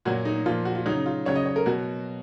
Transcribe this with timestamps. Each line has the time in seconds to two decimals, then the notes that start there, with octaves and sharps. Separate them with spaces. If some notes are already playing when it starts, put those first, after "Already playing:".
0.05 A#2 F#3 F#4
0.25 D#4
0.46 A#2 F3 F4
0.65 F#4
0.75 F4
0.86 C#3 F#3 D#4
1.06 F4
1.25 C#3 F#3 C#5
1.36 D#5
1.46 C#5
1.56 A#4
1.66 B2 F#3 F#4